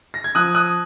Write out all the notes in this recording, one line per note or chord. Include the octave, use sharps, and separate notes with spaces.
A#6
G#6
F3 D#6 F#6
D#6 F#6